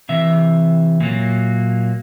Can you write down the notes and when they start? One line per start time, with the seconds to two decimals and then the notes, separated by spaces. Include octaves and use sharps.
0.09 C3 E3 E5
1.00 A#2 F#3 A#3